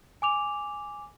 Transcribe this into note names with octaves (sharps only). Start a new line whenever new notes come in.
G#5 D6 F7